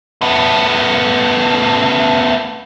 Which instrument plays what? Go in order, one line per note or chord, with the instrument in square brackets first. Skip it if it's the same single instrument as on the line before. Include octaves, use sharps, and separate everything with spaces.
[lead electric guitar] A3 B3